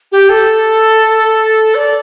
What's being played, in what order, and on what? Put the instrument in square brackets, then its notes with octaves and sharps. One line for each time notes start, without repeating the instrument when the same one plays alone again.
[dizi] G4
A4
D5